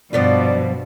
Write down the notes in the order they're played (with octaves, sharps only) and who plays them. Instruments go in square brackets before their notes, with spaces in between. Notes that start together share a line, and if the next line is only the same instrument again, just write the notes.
[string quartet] G2 [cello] B2 [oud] F3 B3 F4 [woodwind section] D5